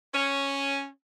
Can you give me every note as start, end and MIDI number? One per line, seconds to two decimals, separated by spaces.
0.13 0.85 61